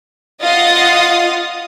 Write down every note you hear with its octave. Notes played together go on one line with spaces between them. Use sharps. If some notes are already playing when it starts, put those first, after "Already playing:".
F4 D#5 F5 F#5 D#6 A6